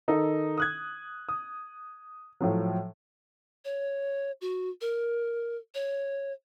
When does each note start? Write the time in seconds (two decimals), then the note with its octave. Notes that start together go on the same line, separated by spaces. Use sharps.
0.08 D#3 D#4 A4
0.58 D#6 F#6 G#6
1.29 D#6
2.40 A2 F3 F#3
3.65 C#5
4.41 F#4
4.81 A#4
5.75 C#5